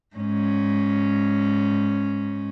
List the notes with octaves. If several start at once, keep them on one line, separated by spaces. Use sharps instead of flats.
G#2 C#4